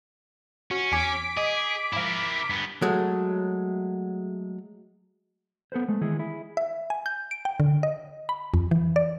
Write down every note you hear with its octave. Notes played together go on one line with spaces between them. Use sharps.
C#4 F#4
E2 G#5 D6 B6 D7
G#4 D#5
G#2 F3 E4 A#4
G2 B3
F#3 G#3 A3
B3 A4 B4 C5
G#3 A3
D#3 E3 G#3 E4 G#4
E4 G#4
E5
G#5
G6
D7
G5
D3
D#5
B5
F2
E3
D5